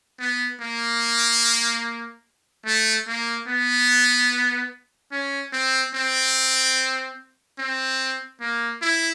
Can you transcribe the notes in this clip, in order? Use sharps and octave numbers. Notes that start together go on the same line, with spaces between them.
B3
A#3
A3
A#3
B3
C#4
C4
C4
C4
A#3
E4